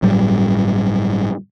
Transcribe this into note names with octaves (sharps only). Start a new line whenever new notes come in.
G1 A2 F#3 G3